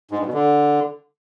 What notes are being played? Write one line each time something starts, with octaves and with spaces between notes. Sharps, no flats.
G#2
G2
B2
D3